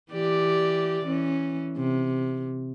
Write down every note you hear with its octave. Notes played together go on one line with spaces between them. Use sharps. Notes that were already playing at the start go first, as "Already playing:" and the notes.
E3 G4 D5
E3 C#4
C3